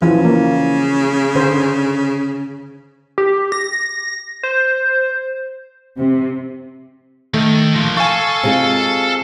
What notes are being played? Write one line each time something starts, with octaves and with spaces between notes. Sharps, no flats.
C#3 E3 F3
A#3
D3 C5
G4
A#6
C5
C3
D#3 A3
F3 A#3
A4 F5 G#5 A5 C#6
C3 G#3 F4